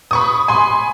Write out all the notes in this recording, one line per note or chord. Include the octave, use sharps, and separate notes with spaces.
B5 C#6 D#6
G#5 B5 C6